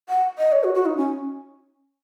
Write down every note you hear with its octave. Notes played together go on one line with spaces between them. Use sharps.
F#5
D#5
C#5
F#4
F#4
D#4
C#4